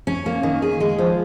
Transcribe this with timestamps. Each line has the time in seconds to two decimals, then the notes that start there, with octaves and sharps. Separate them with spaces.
0.07 C#4
0.26 A#3
0.43 D#3
0.62 G#4
0.80 G#3
0.98 F3